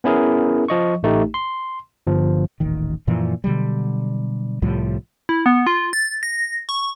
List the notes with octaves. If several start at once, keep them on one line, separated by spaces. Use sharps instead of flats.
B3 C#4 E4 G#4 A#4
F3 D#5 C#6
A1 A3 D#4 G4
C6
G1 F3
D#1 A1 D#3
F#2 A#2 E3 F3
B2 D3 F#3 G3
C2 A2 F3 G3
E4
B3
F4
A6
A#6
C#6